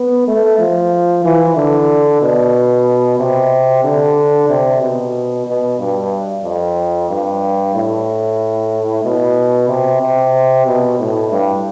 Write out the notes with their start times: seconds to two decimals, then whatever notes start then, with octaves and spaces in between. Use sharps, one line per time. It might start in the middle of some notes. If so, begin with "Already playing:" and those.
Already playing: B3
0.27 A3
0.59 F3
1.24 E3
1.56 D3
2.22 B2
3.19 C3
3.84 D3
4.49 C3
4.81 B2
5.46 B2
5.79 G2
6.44 F2
7.09 G2
7.74 A2
9.04 B2
9.68 C3
10.01 C3
10.66 B2
10.99 A2
11.31 G2